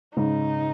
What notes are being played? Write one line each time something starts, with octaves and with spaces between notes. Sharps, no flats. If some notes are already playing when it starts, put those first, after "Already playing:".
G#2 C#3 D#4